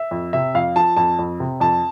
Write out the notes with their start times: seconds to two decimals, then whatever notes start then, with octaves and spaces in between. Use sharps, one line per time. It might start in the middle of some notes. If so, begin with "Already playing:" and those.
Already playing: E5
0.11 F2
0.33 C3 E5
0.55 F2 F5
0.76 F3 A5
0.97 F2 A5
1.19 F2
1.40 C3
1.60 F2 A5